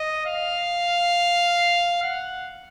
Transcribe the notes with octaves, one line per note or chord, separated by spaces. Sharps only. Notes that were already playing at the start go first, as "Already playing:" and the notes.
Already playing: D#5
F5
F#5